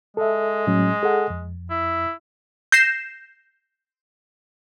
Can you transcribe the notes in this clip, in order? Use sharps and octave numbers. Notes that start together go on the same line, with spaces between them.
G#3 A4 E5
A2 F#3 C#4
G#4 A4 F#5
F2
E4
G6 A#6 C7 E7